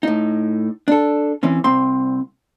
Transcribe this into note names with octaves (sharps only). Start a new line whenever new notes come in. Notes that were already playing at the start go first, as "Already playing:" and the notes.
A2 D#4
D4 A4
E3 C4 C#4
C2 C4 C6